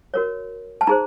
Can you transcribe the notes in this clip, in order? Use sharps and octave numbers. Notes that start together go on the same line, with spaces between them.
F#4 A#4 C#5
A5
D#4 G#4 C5 A#5